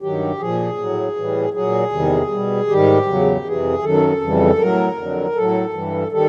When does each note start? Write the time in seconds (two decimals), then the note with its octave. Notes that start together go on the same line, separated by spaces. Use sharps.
0.01 G2 D#3 F#3 G4
0.39 A#2 F3 G#4
0.78 A2 F#3
1.16 A2 E3 G3
1.54 A#2 F#3 G#4
1.92 E2 C3 D#3 G3
2.30 B2 G3
2.68 G#2 D#3 G3 G4
3.06 E2 C#3 F#3
3.45 F2 C3 E3 G#4
3.82 F#2 D#3 F#3 A4
4.21 F2 C#3 E3 G3
4.58 A2 F#3 A#4
4.96 F2 D3 F#3
5.35 A2 F#3 A4
5.73 G2 E3 G3
6.11 D#3 G3 A4